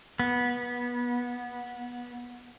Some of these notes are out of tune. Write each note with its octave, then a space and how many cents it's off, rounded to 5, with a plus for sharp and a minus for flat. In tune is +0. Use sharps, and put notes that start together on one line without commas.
B3 -20